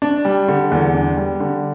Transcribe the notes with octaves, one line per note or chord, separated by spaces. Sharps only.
D4
G3
D3
E2
D4
G3
D3